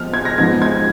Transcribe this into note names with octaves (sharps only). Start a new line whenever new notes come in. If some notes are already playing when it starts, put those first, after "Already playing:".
Already playing: F3 B3 F6
G#6
A#6
G#2 F3 B3 D#4 G#6
G#6